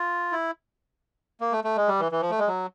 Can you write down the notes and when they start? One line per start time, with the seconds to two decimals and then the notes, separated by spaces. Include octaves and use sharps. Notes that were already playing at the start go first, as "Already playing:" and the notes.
Already playing: F4
0.32 E4
1.41 A#3
1.52 A3
1.64 A3
1.77 G#3
1.88 G3
2.00 E3
2.12 E3
2.22 F3
2.30 A3
2.39 G#3
2.48 F#3